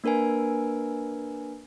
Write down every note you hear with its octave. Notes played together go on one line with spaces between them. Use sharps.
A#3 D4 A#4 B4 G#5